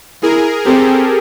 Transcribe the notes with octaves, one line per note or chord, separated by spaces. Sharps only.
E4 G#4 A#4
C4 G4 A4